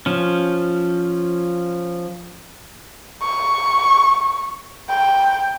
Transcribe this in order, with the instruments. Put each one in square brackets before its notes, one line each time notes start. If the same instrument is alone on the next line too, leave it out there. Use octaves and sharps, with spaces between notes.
[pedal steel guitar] F3 C#4
[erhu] C#6
G5